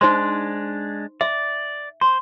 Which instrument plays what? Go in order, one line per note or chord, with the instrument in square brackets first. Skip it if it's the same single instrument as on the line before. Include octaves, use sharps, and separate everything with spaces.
[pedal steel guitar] G#3 D4 [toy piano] D#4 C5 C6
[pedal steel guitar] D5 [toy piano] E5
[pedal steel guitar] C5 [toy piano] C6